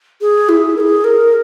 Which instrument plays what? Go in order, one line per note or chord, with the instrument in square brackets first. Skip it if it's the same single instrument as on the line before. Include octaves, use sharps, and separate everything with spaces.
[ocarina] G#4
E4
A#4
G#4
A#4